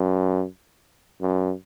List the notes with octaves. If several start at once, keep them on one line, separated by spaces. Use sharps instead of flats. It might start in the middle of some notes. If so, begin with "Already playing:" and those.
Already playing: F#2
F#2